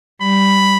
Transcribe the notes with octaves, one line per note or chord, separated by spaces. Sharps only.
G3 B5